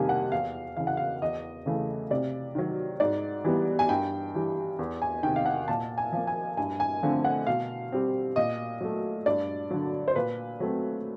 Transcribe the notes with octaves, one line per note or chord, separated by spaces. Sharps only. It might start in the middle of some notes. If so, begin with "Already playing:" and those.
Already playing: F2 C3 D#3 G3 A#3 G#5
F#5
E2 F5
C#3 E3 F5
F#5
F5
E2 D#5
C#3 E3 A3
C3 D5
D#3 F#3
G#2 D5
E3 G3 B3
G#5
G2 G5
E3 G3
E2
G#5
C3 D#3 G5
F5
F#5
A#2 A5
G#5
F3 A#3
G#5
G2 G#5
G#5
D3 F3 A3 C4
F#5
B2 F5
G3 C4
A#2 D#5
F#3 A3
G2 D5
D3 F#3
C5
A#2 B4
F#3 A3 C4